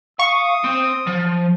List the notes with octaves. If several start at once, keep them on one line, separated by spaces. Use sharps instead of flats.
F5 C#6 D#6
C4
F3